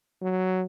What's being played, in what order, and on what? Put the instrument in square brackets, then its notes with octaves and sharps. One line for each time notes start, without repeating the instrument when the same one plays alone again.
[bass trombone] F#3